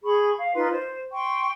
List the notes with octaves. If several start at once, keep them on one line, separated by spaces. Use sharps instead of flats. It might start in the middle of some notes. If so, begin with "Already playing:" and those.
G#4 B5 C#6
F5
D#4 F4 B4 C6
C5
G5 C6 C#6